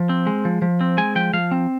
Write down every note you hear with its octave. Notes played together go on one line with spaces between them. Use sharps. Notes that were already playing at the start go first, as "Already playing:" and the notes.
Already playing: F3
C4
G#3
F3
F3
C4
G#3 G#5
F3 G5
F3 F5
C4